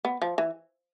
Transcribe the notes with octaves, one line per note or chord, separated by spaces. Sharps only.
B3
F3
E3